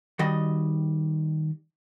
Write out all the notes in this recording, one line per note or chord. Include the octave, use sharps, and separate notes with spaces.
D#3 G3 F#4 D#5